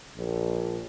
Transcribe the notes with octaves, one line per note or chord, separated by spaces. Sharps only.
A#1